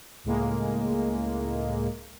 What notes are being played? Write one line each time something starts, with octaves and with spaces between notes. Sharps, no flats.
C#2 A2 G#3 A#3